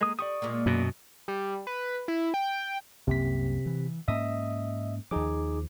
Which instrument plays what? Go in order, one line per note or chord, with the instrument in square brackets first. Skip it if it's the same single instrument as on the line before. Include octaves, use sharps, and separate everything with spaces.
[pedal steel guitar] G#3 D#6 [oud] A#3
[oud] G3 [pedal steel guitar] D5 C#6 D#6
[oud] A#2 G#3 A#3
[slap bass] F#2 B2
[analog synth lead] G3
B4
E4
G5
[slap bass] C2 F#2 A#3 [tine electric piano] C3 B6
[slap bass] E3
[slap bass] G#2 A#3 C#4 [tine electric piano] D#5 E5 D#6
[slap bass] D#2 F3 [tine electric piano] D#4 G#4 D6